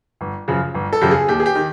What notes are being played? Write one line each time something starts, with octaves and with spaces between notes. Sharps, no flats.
G1
F#2 C#3 F3
G1
A4
F#2 C#3 F3 G4
G#4
D#2 G4
G#4
G4
D#3